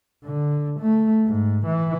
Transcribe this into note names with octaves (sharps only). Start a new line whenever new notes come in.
D3
A3
G#2
E3